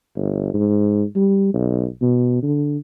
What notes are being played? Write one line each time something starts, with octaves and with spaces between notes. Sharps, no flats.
G1
G#2
G3
B1
B2
D3